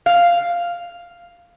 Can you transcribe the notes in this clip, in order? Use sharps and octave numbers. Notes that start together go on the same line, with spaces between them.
F5